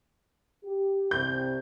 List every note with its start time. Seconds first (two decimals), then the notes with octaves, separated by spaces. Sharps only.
0.64 G4
1.11 C2 C3 G6